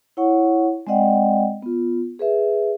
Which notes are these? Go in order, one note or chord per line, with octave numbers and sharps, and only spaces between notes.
E4 C#5 F#5 C#6
G#3 C4 D5 D#5 F#5 G5
B3 F4
G#4 B4 E5